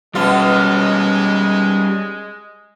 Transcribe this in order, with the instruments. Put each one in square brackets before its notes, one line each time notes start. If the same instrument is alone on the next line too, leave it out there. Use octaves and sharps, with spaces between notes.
[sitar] B2 F4 [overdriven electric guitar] G3 C#4 [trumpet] G#3